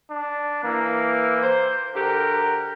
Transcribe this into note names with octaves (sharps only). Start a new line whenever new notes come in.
D4
E3 A#3
C5
D3 F#4 G4 A#4